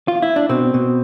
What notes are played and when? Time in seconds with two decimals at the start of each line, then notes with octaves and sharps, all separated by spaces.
0.08 F4
0.22 E4
0.36 D4
0.49 B2 C4
0.74 B2